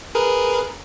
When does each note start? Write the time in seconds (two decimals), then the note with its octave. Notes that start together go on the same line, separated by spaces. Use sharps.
0.15 G#4 A#4 B4